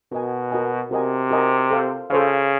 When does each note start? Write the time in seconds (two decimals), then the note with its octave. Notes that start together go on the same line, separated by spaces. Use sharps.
0.12 B2 F#4 A#4 D#5 G#5
0.51 F#4 A#4 D#5 G#5
0.91 C3 F#4 A#4 D#5 G#5
1.31 F#4 A#4 D#5 G#5
1.70 A4 C5 F5
2.10 C#3 A4 C5 F5